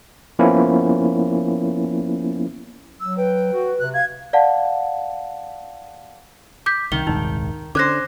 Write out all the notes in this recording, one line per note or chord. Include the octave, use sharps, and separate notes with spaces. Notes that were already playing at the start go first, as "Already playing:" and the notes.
F3 A#3 B3 C#4 E4
F#3 E6
B4 G5
F#4
C3 F#6
F5 G#6
D5 F5 F#5 A5
D6 G6 B6
C2 D#3 G7
D#1 C2 G#2 D#4
D3 C#4 C5 D6 F#6 A#6